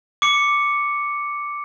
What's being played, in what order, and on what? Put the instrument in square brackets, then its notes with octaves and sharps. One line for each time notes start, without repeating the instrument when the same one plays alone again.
[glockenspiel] D6 C#7